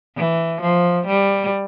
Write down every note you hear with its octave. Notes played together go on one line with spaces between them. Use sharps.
E3
F3
G3